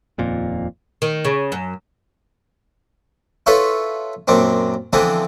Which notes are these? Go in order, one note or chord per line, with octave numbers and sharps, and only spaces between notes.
D#1 F2 A#2
D#3
C#3
F#2
E4 F4 A4 B4 C#5
F#2 A#2 C4 D4
D3 E3 F3 B3 C4 D4